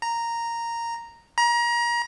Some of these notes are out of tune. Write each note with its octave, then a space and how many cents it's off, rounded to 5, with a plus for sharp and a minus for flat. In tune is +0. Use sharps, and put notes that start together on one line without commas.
A#5 -5
A#5 +30